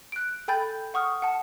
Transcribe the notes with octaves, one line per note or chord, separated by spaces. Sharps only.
F#6 D7
A4 G5 G#5 B5 G6 A6
F#5 C#6 D#6 F6
F#5 A5